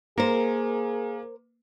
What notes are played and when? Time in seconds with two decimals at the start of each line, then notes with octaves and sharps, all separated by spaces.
0.18 A#3 G#4 A#4 C5